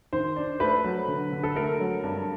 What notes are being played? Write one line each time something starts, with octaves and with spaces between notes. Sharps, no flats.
D#3 C5
D4
A3 B4
F#3
D3
D3
A4
A3 A#4
F#3
G2